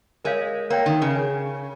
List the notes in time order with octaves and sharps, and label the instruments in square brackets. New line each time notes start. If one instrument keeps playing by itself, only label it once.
[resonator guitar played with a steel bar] G#3 [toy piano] A#4 C#5 F5
[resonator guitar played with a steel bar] A#3 [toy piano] A#4 C#5 G5
[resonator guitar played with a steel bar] D#3
C#3
[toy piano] G#4 C#5 G#5